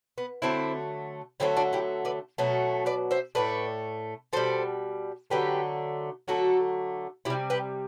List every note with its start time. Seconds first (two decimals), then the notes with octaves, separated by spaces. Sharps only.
0.18 B3
0.42 D3 F#3 A3 C4 E4
1.40 D3 F#3 A3 C4 E4
1.57 D4 F#4
1.73 E4 G4
2.05 B4 D5
2.38 B2 F#3 A3
2.86 B4 D5
3.11 C5 E5
3.35 A2 E3 A3 B4 D5
4.33 B2 G3 A4 C5
5.30 D3 F#3 A3 G4 B4
6.28 D3 F#3 A3 F#4 A4
7.25 C3 G3 E4 G4
7.50 G4 B4